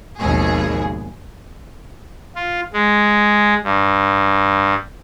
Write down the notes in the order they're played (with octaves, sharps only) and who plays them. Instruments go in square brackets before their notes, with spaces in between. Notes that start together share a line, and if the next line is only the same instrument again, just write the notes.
[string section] G#1 D#2 B2 F3 G#4
[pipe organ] F4
G#3
G2